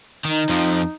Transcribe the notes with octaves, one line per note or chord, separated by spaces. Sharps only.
D#3 D#4
F2 F3